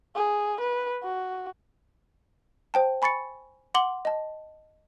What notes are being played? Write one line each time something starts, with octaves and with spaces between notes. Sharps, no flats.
G#4
B4
F#4
C5 G5 A5
G#5 B5 C#6 A6 C#7
F#5 C6 D6 F#7 G7
D#5 A5